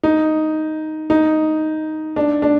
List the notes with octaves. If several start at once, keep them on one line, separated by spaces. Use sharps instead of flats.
D#4
D#4
D4
D4